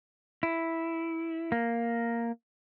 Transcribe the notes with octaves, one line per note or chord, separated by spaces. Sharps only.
E4
A#3